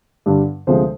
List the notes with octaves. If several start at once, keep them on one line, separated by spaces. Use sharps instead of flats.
G2 D3 G3
D2 C3 F3 G#3 C5